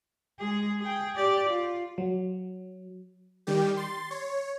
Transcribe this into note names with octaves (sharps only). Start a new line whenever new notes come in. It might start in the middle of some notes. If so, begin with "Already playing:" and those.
G#3 G#4
G#4 G5
G4 D5
F4
F#3
D#3 G3 G4
C6 A6
C#5